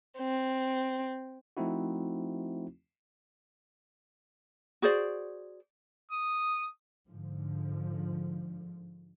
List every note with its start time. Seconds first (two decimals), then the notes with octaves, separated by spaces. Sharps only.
0.19 C4
1.57 F3 A3 C4 D#4 E4 F#4
4.82 F#4 G#4 C5 D5
6.11 D#6
7.09 G#2 D3 F3